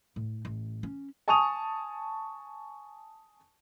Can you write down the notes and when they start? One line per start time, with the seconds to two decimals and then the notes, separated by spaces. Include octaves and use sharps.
0.16 A2
0.45 A1
0.83 C#4
1.28 G#5 A5 C#6 D#6 D#7 F7